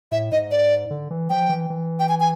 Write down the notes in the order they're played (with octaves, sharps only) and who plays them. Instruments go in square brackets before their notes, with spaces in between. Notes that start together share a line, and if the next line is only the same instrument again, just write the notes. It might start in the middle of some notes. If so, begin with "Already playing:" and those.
[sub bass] A2 [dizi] E5
[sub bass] G#2 [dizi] D#5
[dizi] D5
[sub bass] D3
E3
[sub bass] F3 [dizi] G5
[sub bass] E3
E3
[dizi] G5
G#5
G#5